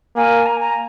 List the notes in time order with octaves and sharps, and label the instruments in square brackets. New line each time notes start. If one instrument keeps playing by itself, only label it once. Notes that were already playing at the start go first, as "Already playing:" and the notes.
[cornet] A#3 [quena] G#5
[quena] A#5
A#5